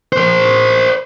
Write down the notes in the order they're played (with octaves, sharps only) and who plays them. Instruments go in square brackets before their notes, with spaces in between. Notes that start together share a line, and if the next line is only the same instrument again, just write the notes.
[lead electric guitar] A#4 C5